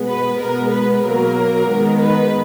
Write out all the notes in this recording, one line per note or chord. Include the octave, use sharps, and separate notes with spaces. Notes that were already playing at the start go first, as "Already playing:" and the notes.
Already playing: B2 G#3 B3
B4
B2 G#3 B3 A#4
B4
B2 F#3 A#3 A#4
D#3 G#3 B3
B4